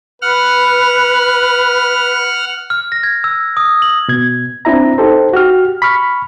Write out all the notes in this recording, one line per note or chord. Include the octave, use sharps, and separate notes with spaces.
B4 F#5 F6
F6
A#6
G#6
E6
D#6
F#7
B2 G#6
C4 D4 E4 E5 A#5
D#4 G4 A4 C5
F#4 G4 F6
B5 C#6 F6